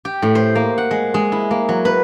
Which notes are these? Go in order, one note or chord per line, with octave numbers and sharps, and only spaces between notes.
G4
A2
C5
A#3
F#5
G#3
G#3
E4
A#3
F#3
B4